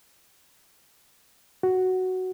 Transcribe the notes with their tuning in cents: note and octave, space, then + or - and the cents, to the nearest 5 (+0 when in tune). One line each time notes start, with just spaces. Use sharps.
F#4 +5